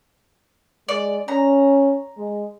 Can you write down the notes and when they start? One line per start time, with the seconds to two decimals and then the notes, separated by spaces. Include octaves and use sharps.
0.88 G#3 D5
1.28 C#4 A#5
2.17 G#3